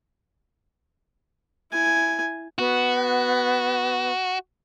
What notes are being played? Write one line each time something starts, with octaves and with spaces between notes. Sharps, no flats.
E4 G#5
B3 F#4